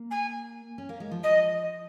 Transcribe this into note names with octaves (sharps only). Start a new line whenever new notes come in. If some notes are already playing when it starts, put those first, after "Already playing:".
Already playing: A#3
G#5
C#4
A#3
G#3
F3
D#5